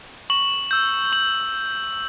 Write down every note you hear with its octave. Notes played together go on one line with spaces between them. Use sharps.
C#6 F#7
E6 G6
C#6 F#7